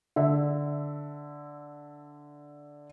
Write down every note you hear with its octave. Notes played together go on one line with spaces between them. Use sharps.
D3 E5